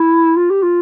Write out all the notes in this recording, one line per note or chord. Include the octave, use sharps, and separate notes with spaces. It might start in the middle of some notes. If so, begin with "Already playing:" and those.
Already playing: E4
F4
G4
F4